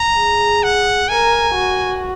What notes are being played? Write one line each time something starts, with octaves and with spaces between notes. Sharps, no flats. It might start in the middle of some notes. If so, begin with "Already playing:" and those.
Already playing: A#5
G#4
F#5
A#4 G#5
F#4